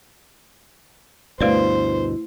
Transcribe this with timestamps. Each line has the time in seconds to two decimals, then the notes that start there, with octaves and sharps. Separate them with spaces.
1.41 D2 G2 B2 A3 E4 B4 C5 D5